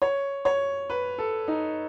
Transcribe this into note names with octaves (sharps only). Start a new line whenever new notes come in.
C#5
C#5
B4
A4
D#4